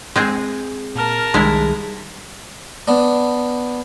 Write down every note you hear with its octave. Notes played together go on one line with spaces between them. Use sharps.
G#3 C4 G#4
A#2 A#4 A5 F6
C2 D#3 G3 G#3 E4
B3 D4